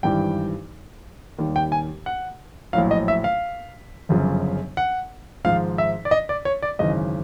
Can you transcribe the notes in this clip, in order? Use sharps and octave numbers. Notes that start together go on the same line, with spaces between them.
G#1 G2 E3 G3 G5
D#2 D#3 G3
G5
G#5
F#5
A#1 A2 F#3 F5
D#5
E5
F5
G1 F#2 C#3 F3
F#5
G#1 G#2 F3 F5
E5
D5
D#5
D5
C#5
D5
G#1 F#2 C#3 E3 D#5